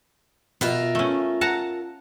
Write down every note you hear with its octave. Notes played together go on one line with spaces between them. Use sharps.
B2 F4 A#4 E5
A3 C#4
F#5 A5 A#5